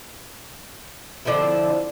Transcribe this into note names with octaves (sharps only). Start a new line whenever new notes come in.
D3 F3 C4 E4